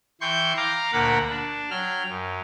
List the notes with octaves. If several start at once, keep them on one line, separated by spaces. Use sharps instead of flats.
E3 G5 C6 C#6 G6
F5 A#5 D6
D2 A#2 A#3 F#5 B5
D4
F#3 G5 F6
F#2